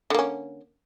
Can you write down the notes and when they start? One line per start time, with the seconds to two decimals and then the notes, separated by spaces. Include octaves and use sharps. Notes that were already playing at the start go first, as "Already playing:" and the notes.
0.10 D3
0.15 A#3
0.19 C#4